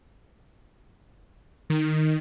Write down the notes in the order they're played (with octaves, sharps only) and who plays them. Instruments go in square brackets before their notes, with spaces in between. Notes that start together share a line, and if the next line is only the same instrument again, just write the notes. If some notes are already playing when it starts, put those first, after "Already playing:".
[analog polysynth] D#3